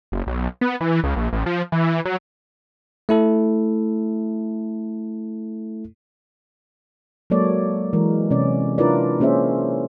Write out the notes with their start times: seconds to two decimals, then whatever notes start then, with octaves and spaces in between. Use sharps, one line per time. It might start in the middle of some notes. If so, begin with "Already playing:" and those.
0.12 F#1
0.27 B1
0.61 B3
0.81 E3
1.04 C#2
1.16 A#1
1.33 A1
1.46 F3
1.72 E3
2.05 F#3
3.09 A3 E4 A4
7.30 F#3 G#3 A#3 A4 C#5 D5
7.93 E3 G#3 A#4
8.31 C3 C#4 D5
8.78 D4 E4 F4 A#4 B4 D5
9.20 A#3 C#4 G#4 C5 E5